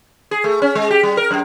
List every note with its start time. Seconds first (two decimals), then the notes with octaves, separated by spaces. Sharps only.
0.31 G#4
0.44 A3
0.62 C#4
0.75 G#3
0.91 G4
1.03 G3
1.17 A#4
1.31 F#2